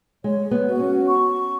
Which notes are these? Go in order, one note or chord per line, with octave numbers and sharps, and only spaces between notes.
G#3 C#5
B3
F#4
C#4
C#6